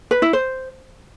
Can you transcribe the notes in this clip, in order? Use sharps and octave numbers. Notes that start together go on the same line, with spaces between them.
B4
E4
C5